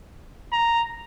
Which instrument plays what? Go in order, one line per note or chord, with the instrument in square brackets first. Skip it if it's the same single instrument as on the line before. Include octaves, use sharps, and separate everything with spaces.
[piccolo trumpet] A#5